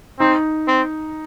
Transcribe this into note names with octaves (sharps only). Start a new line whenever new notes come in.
C4 D#4
C4